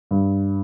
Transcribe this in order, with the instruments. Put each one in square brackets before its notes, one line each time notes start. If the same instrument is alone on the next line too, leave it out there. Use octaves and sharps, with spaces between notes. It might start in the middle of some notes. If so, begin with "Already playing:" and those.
[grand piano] G2